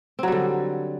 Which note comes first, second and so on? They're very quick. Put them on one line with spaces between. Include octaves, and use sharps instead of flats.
C4 F#3 G3 D3